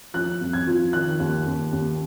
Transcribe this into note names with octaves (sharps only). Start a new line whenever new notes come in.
F3 F#6
F2
G#6
F3
D#3 F#6
D#2
D#2
D#2